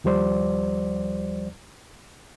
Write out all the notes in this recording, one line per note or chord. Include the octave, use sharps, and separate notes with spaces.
D#2 F3 G3 C5 D5